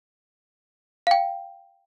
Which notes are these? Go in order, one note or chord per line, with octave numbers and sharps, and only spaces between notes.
F5 G5